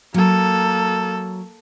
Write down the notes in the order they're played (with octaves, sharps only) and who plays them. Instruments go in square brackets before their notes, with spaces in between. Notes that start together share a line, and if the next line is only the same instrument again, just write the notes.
[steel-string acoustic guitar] F#3 [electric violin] A#3 A4